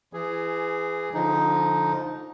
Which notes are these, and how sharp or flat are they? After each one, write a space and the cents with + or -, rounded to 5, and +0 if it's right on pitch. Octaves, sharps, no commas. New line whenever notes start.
E3 +30 G#4 +0
D3 -20 F3 +0 D#4 +0